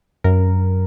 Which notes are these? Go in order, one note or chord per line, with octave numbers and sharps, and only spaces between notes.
F#2 A#4